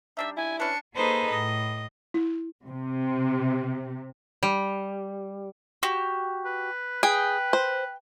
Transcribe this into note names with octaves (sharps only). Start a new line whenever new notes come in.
G3 D4 D#4 E5
E4 G#5
C#4 D4 B4 C#7
A#3 D#4 G#4 A4 B4 C5
A2 D#5
E4
C3
G3
F#4 G4
B4
G#4 B4 G5
C5